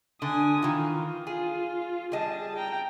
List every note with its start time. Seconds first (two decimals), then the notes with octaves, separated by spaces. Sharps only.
0.22 D3 G#5 D#6
0.62 D#3 E3 F4
1.27 F4 G#4
2.12 G3 G#4 D#5 A5
2.56 G5 A#5